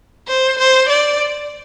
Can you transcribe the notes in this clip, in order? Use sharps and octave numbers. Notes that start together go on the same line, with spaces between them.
C5
C5
D5